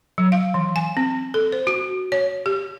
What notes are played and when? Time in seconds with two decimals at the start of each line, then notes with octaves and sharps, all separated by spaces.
0.18 F#3
0.32 F5
0.54 E3
0.76 G#5
0.97 C4
1.34 A4
1.52 C5
1.67 F#4
2.12 C#5
2.46 G4